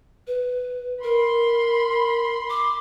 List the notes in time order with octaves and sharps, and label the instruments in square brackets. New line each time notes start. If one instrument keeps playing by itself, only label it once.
[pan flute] B4
[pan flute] A#4 [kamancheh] B5 C6
[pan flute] D6